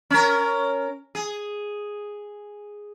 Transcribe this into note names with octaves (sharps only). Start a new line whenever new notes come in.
C#4 A#4
G#4